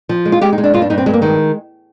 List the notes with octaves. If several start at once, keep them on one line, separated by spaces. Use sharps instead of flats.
F3
G#3
F4
G#3 G4
D#4
G#3
D4
G2 F4
D4
G2 D#4
C4
G2 G#3
A#3
D#3 G#3